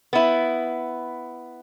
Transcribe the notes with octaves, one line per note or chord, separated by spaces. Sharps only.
B3 E4